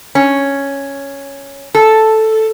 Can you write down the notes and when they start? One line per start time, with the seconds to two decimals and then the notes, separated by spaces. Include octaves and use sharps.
0.15 C#4
1.75 A4